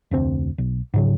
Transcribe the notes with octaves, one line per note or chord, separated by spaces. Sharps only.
F1 D2 C4
B1
G#2 C#3 F#3